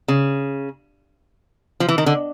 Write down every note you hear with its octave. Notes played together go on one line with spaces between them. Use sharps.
C#3
F3
E3
D#3
D3